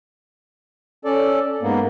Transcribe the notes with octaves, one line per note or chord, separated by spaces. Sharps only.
C#4 A4 D5
G#2 A#3 B3